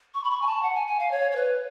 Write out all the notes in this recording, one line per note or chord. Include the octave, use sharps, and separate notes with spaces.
C#6
B5
C#6
G#5
A5
F#5
G#5
G#5
F5
C#5
C#5
B4